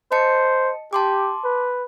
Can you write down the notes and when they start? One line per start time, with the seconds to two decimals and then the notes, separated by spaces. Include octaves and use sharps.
0.12 C5 D#5 A5 C#7
0.93 G4 A5 C6 D6
1.44 B4